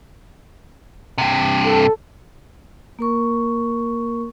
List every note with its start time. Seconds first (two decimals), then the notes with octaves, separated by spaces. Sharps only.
1.18 G2 C3
1.65 A4
2.99 A#3 A#4 C#6